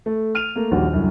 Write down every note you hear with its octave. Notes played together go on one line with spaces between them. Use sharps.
A3
F6 D#7 F7
A3 A#3
A#1 D#2 G3 D4 F#4
C2 F#2 D3